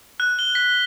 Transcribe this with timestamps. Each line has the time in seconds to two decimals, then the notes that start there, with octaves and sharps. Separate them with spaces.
0.20 F#6
0.39 G7
0.55 B6